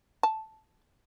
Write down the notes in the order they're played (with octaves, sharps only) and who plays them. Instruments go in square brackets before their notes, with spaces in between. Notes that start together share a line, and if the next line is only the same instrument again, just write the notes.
[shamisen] A5